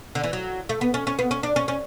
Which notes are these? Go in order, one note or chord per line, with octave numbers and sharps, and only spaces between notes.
D3
E3
F#3
A3
B3
C#4
C#4
B3
C#4
D4
C#4
C#4